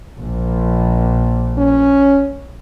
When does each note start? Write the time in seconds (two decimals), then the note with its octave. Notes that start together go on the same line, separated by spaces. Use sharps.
0.18 A#1 A#2
1.58 C#4